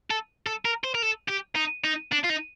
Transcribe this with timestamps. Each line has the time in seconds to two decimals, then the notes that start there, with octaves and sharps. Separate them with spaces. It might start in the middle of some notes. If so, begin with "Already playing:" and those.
0.10 A4
0.47 A4
0.65 A#4
0.84 C5
0.95 A#4
1.02 A4
1.29 G4
1.56 D#4
1.84 D#4
2.12 D4
2.24 F4
2.29 D#4